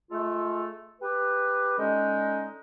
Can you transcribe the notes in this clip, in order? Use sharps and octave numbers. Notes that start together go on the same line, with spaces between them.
G#3 A3 F4 A4
G4 B4
D3 G#3 C#4 D#4